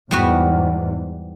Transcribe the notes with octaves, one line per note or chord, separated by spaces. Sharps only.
E2 G#2 G3 B3 F#4